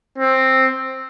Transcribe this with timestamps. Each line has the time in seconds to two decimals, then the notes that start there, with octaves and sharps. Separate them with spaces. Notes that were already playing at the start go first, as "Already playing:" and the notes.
0.18 C4